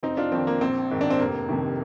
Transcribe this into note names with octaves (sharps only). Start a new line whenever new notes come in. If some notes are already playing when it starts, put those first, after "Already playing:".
F1 C4 D#4
D4 F4
F2 D#3 C4
A#3
A#1 C4
G#2 D#3
D4
C4
F1 A#3
F2 C3 D#3